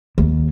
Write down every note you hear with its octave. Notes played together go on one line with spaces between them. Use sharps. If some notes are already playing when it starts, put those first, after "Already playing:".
D#2